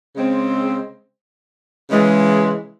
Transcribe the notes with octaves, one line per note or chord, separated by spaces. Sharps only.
C#3 G#3 C4
C#3 E3 G#3